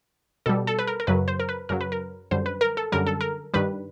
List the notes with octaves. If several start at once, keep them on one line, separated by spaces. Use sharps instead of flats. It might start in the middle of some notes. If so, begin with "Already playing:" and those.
B2 G3 A4
A4
B4
A#4
A#4
F#2 C#3 F#3 B4
C5
A#4
B4
F#2 C#3 F#3 A#4
B4
A#4
F#2 D3 G3 C5
B4
A#4
A4
F#2 D3 G3 A#4
A4
A#4
G2 D#3 G3 B4